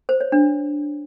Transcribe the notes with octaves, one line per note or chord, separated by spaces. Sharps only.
C5
C#5
D4